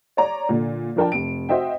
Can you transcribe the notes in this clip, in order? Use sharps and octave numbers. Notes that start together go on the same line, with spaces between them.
C#5 D5 A#5
A#2 D3
F3 D4 A#4 G5 A5
F1 D7
F#4 C5 D#5 E5 G5